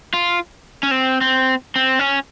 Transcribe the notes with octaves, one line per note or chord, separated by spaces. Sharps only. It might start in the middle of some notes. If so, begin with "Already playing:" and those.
F4
C#4
C4
C4
C4
C#4